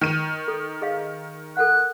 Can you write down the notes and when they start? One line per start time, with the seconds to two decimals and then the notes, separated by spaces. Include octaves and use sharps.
0.01 D#3 D#7
0.48 A4
0.82 G#4 D#5 F5
1.57 A4 A#4 F#5 F#6